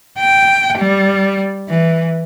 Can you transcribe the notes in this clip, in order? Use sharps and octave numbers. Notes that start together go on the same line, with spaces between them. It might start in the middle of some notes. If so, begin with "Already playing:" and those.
G5
G3
E3